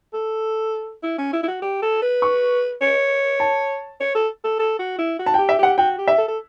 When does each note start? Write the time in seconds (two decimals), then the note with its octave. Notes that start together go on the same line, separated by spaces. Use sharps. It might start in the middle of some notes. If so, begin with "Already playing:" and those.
0.13 A4
1.03 E4
1.18 C#4
1.33 E4
1.43 E4
1.48 F#4
1.62 G4
1.82 A4
2.02 B4
2.22 C#6
2.81 C#5
3.40 A5
4.00 C#5
4.15 A4
4.44 A4
4.59 A4
4.79 F#4
4.98 E4
5.19 F#4
5.26 A5
5.34 G5
5.38 G4
5.49 E5
5.59 G4 F#5
5.78 F#4 G5
5.98 G4
6.08 E5
6.18 A4
6.28 A4